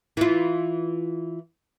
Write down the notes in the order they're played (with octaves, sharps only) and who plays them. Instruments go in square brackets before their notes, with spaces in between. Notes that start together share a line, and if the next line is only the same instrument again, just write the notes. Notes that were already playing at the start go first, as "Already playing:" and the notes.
[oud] E3 F4